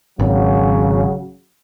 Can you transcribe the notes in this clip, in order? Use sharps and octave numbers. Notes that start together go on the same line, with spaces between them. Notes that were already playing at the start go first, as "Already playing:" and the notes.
G#1 C#3 F#3